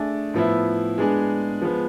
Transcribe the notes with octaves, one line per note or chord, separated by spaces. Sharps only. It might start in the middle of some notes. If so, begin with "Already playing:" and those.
Already playing: A3 D4 G#4
A2 F3 B3 E4
G#3 B3 D4 G#4
F3 G#3 B3